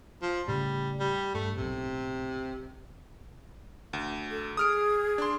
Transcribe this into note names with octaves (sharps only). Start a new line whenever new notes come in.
F3
A2 C#3 G3
G3
G2 A3
B1 A2 C3
D2
A4
G#4 D#6 F6 D7
D4 C6